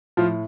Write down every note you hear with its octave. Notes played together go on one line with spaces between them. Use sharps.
A2 F3 F4